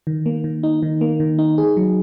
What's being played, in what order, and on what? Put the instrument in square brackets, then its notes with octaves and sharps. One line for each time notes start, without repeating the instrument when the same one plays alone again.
[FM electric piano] D#3
A#3
D#3
D#4
D#3
A#3
D#3
D#4
G#4
F#3